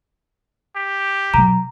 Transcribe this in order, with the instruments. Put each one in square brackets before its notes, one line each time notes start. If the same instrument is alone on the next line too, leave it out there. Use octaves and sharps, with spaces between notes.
[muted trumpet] G4
[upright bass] B2 F#3 [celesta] A#5